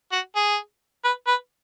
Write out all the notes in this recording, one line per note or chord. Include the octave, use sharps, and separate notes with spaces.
F#4
G#4
B4
B4